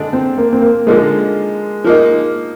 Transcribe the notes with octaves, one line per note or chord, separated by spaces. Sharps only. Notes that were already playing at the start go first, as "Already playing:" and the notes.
Already playing: D3 G#3 D4
C4
A#3
C4
A#3
D3 F3 G#3 A#3 D#4
F3 A#3 D#4